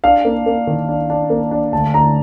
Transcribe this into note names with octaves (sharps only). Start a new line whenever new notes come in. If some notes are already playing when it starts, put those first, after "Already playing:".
D4 F5
A#3
A#3
D#3
D4
D4
A#3
D4
D2 A5
D2 A#5